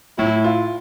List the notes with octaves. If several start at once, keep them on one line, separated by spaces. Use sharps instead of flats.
A2 E4
F4